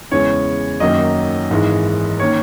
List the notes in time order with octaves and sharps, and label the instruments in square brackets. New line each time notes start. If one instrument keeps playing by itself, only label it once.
[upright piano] E2 C#3 G#3 C#4 C#5
F#2 D#3 F#3 A#3 D#4 D#5
G#1 G#2 E3 G#3
D#3 A#3 C#4 C#5